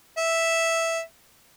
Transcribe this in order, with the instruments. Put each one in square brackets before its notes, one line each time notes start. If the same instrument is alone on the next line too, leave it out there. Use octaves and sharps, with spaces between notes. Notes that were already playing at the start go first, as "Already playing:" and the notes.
[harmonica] E5